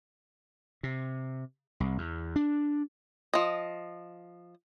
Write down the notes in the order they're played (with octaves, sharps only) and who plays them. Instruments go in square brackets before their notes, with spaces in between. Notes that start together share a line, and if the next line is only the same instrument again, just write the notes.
[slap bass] C3
C2
E2
D4
[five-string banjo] F3 D#5